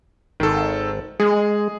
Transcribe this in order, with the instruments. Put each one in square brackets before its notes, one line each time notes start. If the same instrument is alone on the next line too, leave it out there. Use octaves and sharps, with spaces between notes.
[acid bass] G#1 [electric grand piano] D#3 A4
[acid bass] G#3 [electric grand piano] G#4